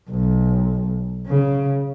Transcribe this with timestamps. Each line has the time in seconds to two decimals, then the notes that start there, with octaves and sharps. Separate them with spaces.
0.11 B1
1.27 C#3